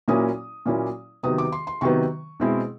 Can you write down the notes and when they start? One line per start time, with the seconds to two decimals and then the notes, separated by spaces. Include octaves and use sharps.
0.08 A#2 F#3 A#3 C#4 E4 D#6
0.66 A#2 F#3 A#3 C#4 E4
1.23 C3 D#3 F#3 B3 D#6
1.38 D6
1.52 C6
1.67 C6
1.81 C3 D#3 F#3 B3 C#6
2.40 B2 G#3 C4 E4